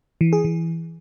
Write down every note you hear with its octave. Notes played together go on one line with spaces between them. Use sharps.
E3
G#4
E3